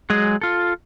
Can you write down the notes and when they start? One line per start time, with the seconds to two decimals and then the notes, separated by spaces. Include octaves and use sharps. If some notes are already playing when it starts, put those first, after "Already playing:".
0.10 F#3 G#3 G#4 D#5
0.41 F4 A4